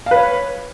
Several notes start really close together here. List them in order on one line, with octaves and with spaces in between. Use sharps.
F5 B4 C#5